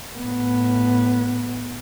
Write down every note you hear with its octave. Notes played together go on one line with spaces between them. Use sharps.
A2 B3